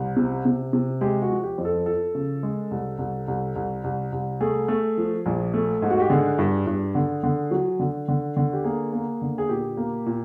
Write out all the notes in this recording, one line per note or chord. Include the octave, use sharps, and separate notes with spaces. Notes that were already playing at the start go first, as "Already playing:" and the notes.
Already playing: C2
C3
C3
C3
G#3 G4
F#4
F3
G4
F2
A4
F3 A4
C#3
G#3
C2
C2
C2
C2
C2
C2
A3 G#4
A3
F3
A#1
A3
G#2
F#4
G4
D3 G#4
G2
G2
D3
D3
F#3
D3
D3
D3
G4
A#3 G#4
A#3
D3
G#4
A#2 G4
A#3
A#2